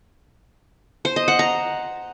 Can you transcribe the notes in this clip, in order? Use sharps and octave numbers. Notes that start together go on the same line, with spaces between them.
C5
D#5
F#5
A#5